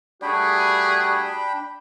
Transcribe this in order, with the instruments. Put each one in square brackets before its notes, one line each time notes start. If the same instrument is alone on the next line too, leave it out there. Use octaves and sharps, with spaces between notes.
[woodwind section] G3 A3 F#4 [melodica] D4 G5 B5 [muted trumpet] G#4